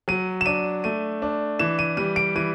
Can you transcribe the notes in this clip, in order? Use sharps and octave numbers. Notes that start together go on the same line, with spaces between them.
F#3 D#7
E7
D4 D#7
A3 D#7
D4
E3 E7
D#7
G3 D#7
D7
E3 D#7